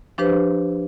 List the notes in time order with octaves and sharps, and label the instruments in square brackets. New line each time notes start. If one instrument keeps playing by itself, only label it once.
[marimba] F3 D4 G4 B4 C5